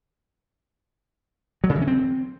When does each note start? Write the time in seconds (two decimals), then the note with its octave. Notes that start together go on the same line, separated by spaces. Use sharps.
1.64 F#3
1.70 C#3
1.76 E3
1.81 C#4
1.87 C4